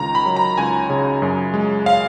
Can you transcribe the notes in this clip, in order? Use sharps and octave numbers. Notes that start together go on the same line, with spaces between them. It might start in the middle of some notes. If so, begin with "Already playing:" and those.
Already playing: C#2 D#3 A#5
B5
F#3
A#5
C#2 G#5
C#3
F#2
G#3
F5